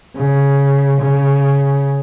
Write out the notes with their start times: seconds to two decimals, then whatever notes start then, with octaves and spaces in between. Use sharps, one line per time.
0.16 C#3
1.02 C#3